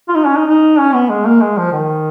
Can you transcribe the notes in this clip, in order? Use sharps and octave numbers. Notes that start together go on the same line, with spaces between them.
F4
D#4
C#4
D#4
D#4
C#4
B3
G#3
A#3
G#3
F3
D#3